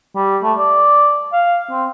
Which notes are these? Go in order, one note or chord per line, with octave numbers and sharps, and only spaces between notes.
G3
A3
D5
F5
C4